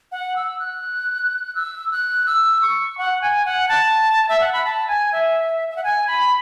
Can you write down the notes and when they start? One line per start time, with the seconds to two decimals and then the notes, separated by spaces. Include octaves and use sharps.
0.12 F#5
0.36 E6
0.59 F#6
1.55 E6
1.91 F#6
2.26 E6
2.62 C#6
2.98 F#5
3.21 G#5
3.45 F#5
3.69 A5
4.29 E5
4.40 F#5
4.53 B5
4.65 A5
4.88 G#5
5.12 E5
5.69 E5
5.76 F#5
5.84 G#5
6.07 B5